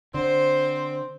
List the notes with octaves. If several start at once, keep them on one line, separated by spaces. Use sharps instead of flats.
D3 C4 C5